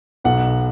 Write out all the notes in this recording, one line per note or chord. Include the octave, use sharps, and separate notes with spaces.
B1 B2 F#5